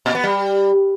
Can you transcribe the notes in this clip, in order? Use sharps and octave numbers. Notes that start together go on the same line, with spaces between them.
A#2
B3
G3